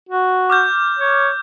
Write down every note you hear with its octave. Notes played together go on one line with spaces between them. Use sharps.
F#4
D6 F6 G6
C#5